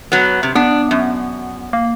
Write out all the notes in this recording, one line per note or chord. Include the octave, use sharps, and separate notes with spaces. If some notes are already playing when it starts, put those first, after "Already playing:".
F#3 B3
C3
B3 D4
F#2
A#3